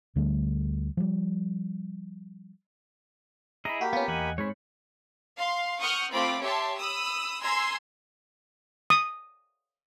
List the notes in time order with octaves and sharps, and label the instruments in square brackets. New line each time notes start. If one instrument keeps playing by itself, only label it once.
[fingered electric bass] D2 D3 G3 A3
F3 G3
[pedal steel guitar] E4 G#4 D#5 [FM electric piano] A#5 B5
[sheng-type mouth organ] A#3 G4 B5 [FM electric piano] F#4
[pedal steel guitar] B3 [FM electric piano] C#4 F4
[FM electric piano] E2 [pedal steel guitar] D#5 F#5 G#5
[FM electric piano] G#2 B5 [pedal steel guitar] C4 G#4 C#5
[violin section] F5 C6
F#5 C#6 D#6 F6 G6
A3 C4 F4 B5 D6
G4 C#5 E5 A5 C6
B5 D#6 E6
G#5 A#5 C6 E6 G#6
[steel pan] D#6